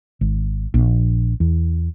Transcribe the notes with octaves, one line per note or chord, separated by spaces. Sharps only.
G#1
A#1
E2